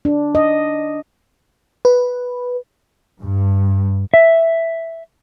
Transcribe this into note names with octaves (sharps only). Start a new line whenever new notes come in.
D4
D#5
B4
G2
E5